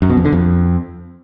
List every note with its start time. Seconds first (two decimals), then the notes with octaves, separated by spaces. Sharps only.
0.02 F#2
0.10 B2
0.17 F2
0.25 D3
0.32 F2